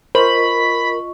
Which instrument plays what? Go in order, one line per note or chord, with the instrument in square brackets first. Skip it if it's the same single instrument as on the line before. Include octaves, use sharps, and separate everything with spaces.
[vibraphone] F4 D#5 C#6 [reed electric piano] A#4 [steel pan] C5 [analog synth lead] B5